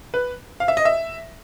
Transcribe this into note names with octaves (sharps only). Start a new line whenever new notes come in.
B4
F5
E5
D#5
E5